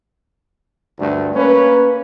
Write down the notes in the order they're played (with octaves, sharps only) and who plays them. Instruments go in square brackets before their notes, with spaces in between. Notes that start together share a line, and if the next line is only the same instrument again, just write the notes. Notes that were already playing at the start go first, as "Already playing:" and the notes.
[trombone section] D2 G2 A3 D4
A#3 C#4 B4